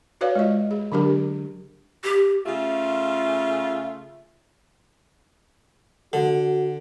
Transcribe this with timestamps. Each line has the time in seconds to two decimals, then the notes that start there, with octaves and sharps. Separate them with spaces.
0.21 F#4 B4 C#5 D5 F5
0.35 G#3 F4 D#5
0.71 G#4
0.92 D3 F#3 D4 G4 A#4
2.04 G4
2.46 C#3 A3 F4
6.13 D3 F#4